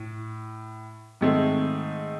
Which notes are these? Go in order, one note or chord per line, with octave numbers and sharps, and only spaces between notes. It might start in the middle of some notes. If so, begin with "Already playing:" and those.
Already playing: A2
G#2 D#3 A3 C4